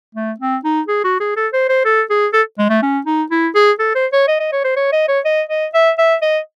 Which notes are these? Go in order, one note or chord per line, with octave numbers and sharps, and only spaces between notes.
A3
C4
D#4
G#4
F#4
G#4
A4
C5
C5
A4
G#4
A4
G#3
A3
C#4
D#4
E4
G#4
A4
C5
C#5
D#5
D#5
C#5
C5
C#5
D#5
C#5
D#5
D#5
E5
E5
D#5